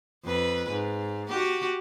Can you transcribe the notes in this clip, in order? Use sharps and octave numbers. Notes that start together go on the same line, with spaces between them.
F2 B4
G#2
F#4 G4